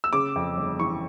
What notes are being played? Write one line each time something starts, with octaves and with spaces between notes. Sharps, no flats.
E6
C#3 D6
F2
G1
E3 C#6